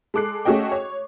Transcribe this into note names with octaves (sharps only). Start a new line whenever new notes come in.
G#3 A4 D6 F#6 C7
A3 C#4 F#4 G#4 D#5 G5
C#5